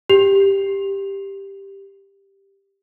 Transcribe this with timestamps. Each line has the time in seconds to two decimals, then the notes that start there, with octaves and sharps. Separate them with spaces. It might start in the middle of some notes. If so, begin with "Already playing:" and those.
0.09 G4 F7